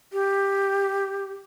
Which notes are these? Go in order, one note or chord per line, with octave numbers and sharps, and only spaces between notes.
G4